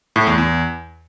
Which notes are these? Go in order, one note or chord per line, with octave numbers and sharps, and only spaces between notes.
A2
E2
E2